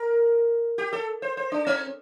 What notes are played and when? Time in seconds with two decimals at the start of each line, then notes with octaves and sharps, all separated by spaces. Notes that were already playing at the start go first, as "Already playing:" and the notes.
Already playing: A#4
0.78 G4
0.93 A4
1.22 C5
1.37 C5
1.52 D4
1.67 C4